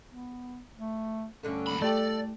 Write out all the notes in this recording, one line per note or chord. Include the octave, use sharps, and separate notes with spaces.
B3
A3
G2 D3 A3 C#4
D#2 B5
A3 E4 G4 A4 D5